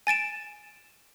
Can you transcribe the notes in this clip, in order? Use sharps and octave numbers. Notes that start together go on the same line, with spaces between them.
G#5 A6 D7 E7